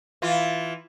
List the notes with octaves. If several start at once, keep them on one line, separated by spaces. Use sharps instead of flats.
E3 F4